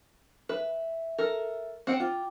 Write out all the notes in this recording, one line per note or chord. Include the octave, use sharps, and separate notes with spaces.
B4 E5
A4 A#4
C4 F#5 G5
F4 G5 D6